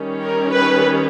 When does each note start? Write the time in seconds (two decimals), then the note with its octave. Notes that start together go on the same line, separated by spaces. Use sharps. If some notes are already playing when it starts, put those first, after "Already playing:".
Already playing: D#3 G3 C#4
0.21 A#4
0.52 B4